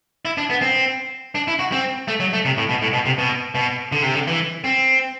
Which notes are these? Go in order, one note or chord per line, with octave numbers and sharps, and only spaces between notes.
E4
D4
B3
C4
D4
E4
F#4
C4
A3
F#3
A3
C3
A2
B2
A2
B2
C3
B2
B2
D3
C3
D3
E3
C4